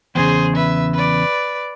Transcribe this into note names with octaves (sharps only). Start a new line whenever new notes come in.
E2 A2 C#3 G#4 C5
B4 E5
B4 D5